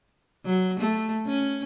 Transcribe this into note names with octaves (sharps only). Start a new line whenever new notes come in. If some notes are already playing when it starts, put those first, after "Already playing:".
F#3
A3
C#4